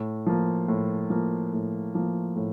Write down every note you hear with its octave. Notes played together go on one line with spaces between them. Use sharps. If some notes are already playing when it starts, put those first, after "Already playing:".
Already playing: A2
F3 A#3
A2
F3 A#3
A2
F3 A#3
A2